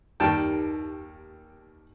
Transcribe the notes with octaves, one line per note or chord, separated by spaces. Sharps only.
D#2 D#3 G3 G5 A5